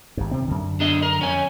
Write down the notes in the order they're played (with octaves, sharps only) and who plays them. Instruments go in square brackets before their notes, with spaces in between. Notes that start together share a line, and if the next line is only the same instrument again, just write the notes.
[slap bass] G#1 G2
C3 C4
F#2 D3
[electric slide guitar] D4 G#4 D#5
A#4
F2 C#4 G#5